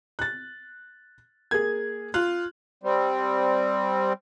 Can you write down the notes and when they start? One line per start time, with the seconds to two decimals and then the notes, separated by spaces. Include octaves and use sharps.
0.19 F#6 A6
1.51 A#3 G#4 G#6
2.14 F4 F#6
2.83 G3 C4